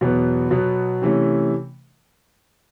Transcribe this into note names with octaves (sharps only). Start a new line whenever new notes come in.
E2 B2 F#3 B3
B2 F#3 B3
C3 E3 A3 C#4